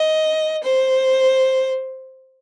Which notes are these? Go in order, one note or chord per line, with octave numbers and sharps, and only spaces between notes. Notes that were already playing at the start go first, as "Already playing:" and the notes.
Already playing: D#5
C5